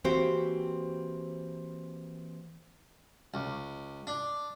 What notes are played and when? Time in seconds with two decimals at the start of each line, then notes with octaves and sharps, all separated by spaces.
0.04 E3 A#3 C4 F#4 G4 C5
3.34 C#2
4.07 D4